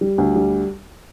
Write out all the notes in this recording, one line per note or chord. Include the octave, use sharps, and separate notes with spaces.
G3
D2
G3